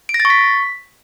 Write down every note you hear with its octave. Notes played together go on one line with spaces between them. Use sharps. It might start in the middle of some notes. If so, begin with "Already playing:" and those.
D7
A#6
A6
C#6
B6